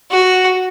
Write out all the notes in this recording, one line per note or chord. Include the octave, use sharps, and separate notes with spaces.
F#4